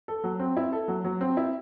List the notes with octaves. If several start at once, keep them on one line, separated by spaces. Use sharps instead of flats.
A4
F#3
C4
E4
A4
F#3
F#3
C4
E4